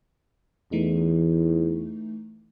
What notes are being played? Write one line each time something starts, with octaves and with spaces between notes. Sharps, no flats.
E2 E3 A3 D#4